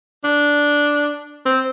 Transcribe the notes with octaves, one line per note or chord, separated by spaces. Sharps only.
D4
C4